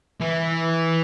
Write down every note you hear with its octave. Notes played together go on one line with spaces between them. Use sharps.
E3